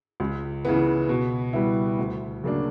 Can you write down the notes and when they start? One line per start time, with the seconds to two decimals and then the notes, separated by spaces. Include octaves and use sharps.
0.20 C#2
0.65 C#3 E3 B3
1.09 B2
1.53 G3 B3 E4
1.99 D2
2.43 C#3 F#3 A#3 D4